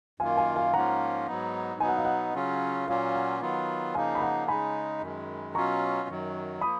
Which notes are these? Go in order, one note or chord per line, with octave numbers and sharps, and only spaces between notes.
F#2 D#3 A#3 F4 F5 G#5
F5 G#5
F5 G#5
G#2 F3 A#3 C#4 F4 F#5 A#5
G#2 F#3 B3 D#4
B2 F#3 B3 D#4 G#5
F#5
F5
F#5
C#3 F#3 C#4 F4
A#2 F#3 A#3 C#4 F4 F5
F#5
D#3 F#3 B3 F4
C#3 F3 A#3 D#4 F5 G#5
B5
F#5 A#5
C#3 G#3 D#4 G#5 B5
F#2 D#3 G#3
B2 F#3 C#4 F4 A#5 C#6
F#2 D#3 F#3
F3 A#3 B5 D#6